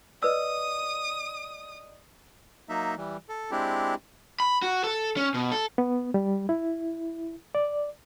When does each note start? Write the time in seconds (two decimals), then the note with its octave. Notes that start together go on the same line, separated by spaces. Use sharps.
0.23 B4 D5 D#5 D#6 E6
2.69 F#3 A#3 D#4 E5
2.98 E3 G3
3.29 A4
3.51 G#3 C4 D4 E4 G4
4.40 B5
4.62 F#4
4.84 A4
5.17 C#4
5.34 B2
5.51 A4
5.78 B3
6.14 G3
6.49 E4
7.55 D5